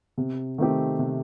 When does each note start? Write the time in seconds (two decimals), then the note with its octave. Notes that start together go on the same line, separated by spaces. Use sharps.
0.18 C3
0.58 D#3 A3 C4 G4
0.99 C3